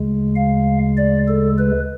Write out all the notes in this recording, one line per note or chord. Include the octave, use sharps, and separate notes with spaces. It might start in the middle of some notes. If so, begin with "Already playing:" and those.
Already playing: D2 C#3 G#3
F5
D5
A4
B4